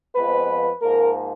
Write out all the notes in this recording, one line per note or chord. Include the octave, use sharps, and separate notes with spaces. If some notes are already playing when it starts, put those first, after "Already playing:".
F2 F3 G#3 B3 B4
G#2 F3 A#3 A#4